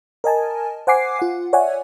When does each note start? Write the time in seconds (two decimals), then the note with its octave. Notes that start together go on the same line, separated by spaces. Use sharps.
0.24 A#4 D#5 G#5 A5
0.87 C5 F#5 G#5 D6 C7
1.19 F4 F#5
1.53 C#5 D5 E5 F#5 G#5